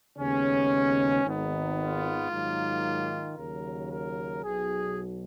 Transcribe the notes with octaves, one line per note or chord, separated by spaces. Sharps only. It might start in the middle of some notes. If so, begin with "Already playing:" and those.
D#2 C#3 G#3 B3 C#4
G#1 G#2 D#3 G#3 B3 D#4
F4
G#2 D#3 F#3 A#3
D#2 C#3 F#3 A#4
A#4
B1 B2 F#3 G#4